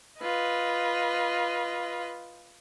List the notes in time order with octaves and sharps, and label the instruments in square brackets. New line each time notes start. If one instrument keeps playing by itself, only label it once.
[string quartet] F4 B4 D#5